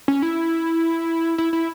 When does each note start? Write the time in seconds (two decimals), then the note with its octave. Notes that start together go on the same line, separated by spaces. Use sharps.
0.08 C#4
0.22 E4
1.38 E4
1.53 E4